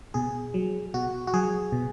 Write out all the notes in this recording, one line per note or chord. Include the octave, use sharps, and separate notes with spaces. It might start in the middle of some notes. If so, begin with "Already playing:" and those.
B2 G#4
F#3
B2 F#4
F#4
F#3 G#4
B2